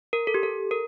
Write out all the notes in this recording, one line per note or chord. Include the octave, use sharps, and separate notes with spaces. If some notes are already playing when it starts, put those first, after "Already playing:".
A#4
A4
G4
A4
A#4